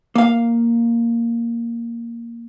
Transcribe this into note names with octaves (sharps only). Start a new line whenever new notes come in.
A#3 F5